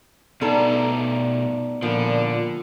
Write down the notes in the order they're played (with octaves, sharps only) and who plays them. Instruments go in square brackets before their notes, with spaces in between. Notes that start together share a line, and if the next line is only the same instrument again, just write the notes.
[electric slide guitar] B2 A3 A#5 [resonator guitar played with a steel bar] G3 D4 A4 [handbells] B3 D#4
[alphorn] A#2 [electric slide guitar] D3 [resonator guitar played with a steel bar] F3 G3